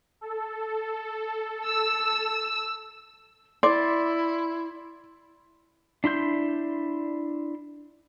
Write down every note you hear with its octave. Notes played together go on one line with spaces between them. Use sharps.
A4
E6
E4 D5 C6
D4 E4 C6 G6